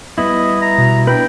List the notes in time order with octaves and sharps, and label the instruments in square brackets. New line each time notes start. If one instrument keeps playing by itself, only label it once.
[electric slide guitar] G3 B3 E4 [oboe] D#5
[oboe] A#5
[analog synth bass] B2
[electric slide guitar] D4 E4 B4 [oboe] G5